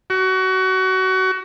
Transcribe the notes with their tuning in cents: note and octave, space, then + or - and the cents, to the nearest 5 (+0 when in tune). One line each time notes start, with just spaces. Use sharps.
F#4 +25